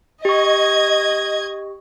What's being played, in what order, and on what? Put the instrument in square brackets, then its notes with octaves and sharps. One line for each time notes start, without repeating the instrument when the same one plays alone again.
[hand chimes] G4 C#6 [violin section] D#5 G#6